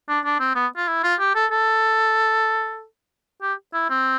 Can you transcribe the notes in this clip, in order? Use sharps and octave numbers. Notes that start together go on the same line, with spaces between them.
D4
D4
C4
B3
F4
E4
F4
G4
A4
A4
G4
E4
C4